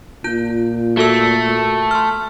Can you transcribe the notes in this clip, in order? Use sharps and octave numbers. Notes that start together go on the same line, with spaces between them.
A#2 F4 G6
A3 F#4 A4 E6
C6 F6